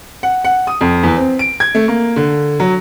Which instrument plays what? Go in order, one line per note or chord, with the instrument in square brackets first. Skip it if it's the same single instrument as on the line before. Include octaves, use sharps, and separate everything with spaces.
[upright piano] F#5
F#5
D#6
F2
E2
C4
D7
G#6
A3
A#3
D3
F#3